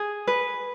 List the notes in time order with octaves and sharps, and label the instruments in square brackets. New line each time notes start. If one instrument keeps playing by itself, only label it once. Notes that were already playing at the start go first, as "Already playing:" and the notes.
Already playing: [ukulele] G#4
B4